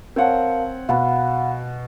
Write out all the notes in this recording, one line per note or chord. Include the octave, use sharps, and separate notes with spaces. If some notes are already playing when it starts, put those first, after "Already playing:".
C4 A#4 C#5 F5 F#5 A5
B2 F5 F#5 B5